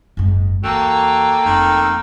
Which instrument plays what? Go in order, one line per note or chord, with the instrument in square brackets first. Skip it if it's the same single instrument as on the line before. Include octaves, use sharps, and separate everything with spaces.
[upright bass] F#1 G#2
[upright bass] E2 [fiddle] A#3 [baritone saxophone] F#4 [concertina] A4 G5
[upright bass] F1 [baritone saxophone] D#3